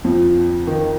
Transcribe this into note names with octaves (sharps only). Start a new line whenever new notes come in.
F2 F3
D#3